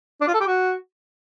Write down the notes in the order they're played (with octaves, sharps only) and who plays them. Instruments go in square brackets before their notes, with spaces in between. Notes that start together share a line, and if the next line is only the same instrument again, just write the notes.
[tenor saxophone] D4
F4
A4
G4
F#4